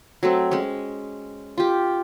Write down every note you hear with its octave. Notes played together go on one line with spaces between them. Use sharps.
F#3 A3 C4
G#3 C#4
F4 G4